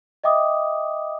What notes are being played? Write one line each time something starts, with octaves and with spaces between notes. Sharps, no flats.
D#5 E5 G5 D6 D#6